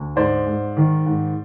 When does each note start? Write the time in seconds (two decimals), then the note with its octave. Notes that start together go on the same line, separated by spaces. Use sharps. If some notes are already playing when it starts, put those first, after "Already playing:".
Already playing: D2
0.16 G#2 C5 D5
0.47 G#2
0.77 D#3
1.06 G#2